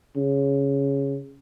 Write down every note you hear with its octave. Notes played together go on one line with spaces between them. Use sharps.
C#3